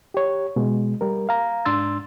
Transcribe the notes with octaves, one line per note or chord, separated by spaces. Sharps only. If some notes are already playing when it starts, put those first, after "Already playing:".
G4 C#5
B2 G#3
G3 A#4
F5 A#5
G#2 D4 C6 E6 A6